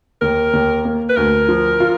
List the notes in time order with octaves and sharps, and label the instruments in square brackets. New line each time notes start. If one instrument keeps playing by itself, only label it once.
[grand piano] D#2 [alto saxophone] A#4
[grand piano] D#2
A#3
[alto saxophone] B4
[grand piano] D2 [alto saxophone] A#4
[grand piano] F3
F4